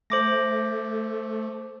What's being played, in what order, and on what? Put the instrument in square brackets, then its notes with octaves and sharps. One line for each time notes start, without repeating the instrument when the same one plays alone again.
[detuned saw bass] A3 [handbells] C5 D6 A#6